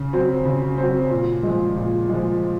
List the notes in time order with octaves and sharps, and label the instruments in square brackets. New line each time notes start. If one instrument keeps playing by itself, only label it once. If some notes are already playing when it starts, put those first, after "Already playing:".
Already playing: [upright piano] C#3
F#3 C4
C#3
F#3 C4
A#2
F3 G#3
A#2
F3 G#3